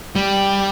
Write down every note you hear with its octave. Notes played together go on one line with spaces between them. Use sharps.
G3